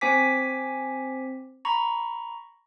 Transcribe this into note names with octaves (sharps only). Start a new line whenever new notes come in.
C4 C5 G#5 D6 B6
A#5 B5 C#6